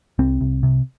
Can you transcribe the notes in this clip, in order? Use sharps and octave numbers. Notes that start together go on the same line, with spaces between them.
C2 C4
C2
C3